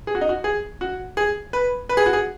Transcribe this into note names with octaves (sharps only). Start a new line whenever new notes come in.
G#4
F#4
D#4
F#4
G#4
F#4
G#4
B4
B4
G#4
F#4
G#4